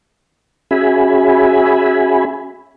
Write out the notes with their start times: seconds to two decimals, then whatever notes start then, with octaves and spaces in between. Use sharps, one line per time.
0.71 C#4 F#4 G#4 E5 G#5 B5